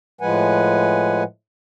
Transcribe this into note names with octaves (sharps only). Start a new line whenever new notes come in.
A2 F3 G#3 B4 F#5 G#5